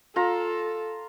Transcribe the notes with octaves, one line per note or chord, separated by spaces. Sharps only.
F4 A4 A#5